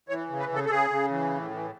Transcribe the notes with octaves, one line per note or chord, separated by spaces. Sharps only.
E3 C#5
C#3
B4
C#3 A4
A4
C#3 G#4
C#3
E3
A2
E3